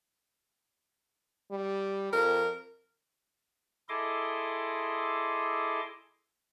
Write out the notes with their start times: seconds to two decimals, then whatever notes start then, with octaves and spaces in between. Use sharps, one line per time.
1.51 G3
2.13 F2 A#4
3.89 E4 G#4 A4 D#5 C6 D6